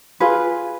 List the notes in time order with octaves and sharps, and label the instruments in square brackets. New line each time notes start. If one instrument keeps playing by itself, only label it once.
[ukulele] F4 G#4 B4